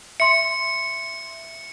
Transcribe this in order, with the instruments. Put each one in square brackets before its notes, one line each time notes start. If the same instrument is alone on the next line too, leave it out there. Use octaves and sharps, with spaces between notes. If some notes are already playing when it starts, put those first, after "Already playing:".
[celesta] E5 C6 [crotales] C#7